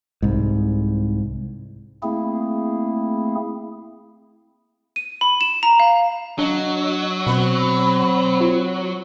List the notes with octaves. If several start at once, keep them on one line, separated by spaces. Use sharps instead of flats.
C2 G#2
A3 A#3 C4 E4 G#4
D#7
B5
E7
A#5
F5
F#3 D4 D#5
B2 C4 B5
F4